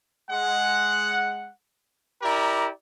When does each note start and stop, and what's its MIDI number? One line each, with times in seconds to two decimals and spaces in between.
0.31 1.50 56
0.31 1.50 78
2.22 2.70 64
2.22 2.70 67
2.22 2.70 70
2.22 2.70 74
2.22 2.70 82